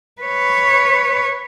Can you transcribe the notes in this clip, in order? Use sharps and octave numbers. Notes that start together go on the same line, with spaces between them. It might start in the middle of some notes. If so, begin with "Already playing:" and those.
B4 C#5